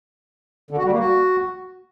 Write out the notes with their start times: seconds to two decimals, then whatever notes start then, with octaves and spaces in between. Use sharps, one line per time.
0.71 D3
0.78 F#4
0.85 G3
0.92 A#3
0.99 F#4